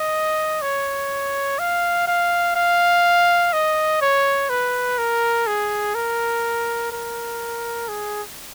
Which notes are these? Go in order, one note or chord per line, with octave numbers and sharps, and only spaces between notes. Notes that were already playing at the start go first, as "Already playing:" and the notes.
Already playing: D#5
C#5
F5
F5
F5
D#5
C#5
B4
A#4
G#4
A#4
A#4
G#4